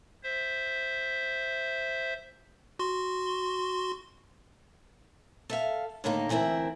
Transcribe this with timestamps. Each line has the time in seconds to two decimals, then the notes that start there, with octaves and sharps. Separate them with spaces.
0.23 C5 E5
2.79 F#4 C6
5.50 A4 E5 F5
6.04 A2 D3 D#3 A#3 D#4
6.29 D2 E3 C4 E4 A#4